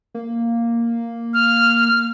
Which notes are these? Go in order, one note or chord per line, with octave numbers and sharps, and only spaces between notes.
A#3
F6